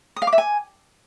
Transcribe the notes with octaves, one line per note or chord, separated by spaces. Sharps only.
D#6
F5
D6
E5
G#5